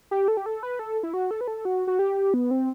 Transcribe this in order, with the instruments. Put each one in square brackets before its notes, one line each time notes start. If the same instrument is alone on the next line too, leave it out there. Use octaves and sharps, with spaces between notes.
[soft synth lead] G4
A4
G4
A4
B4
A4
E4
F#4
A4
B4
A4
F#4
F#4
G4
B3
C4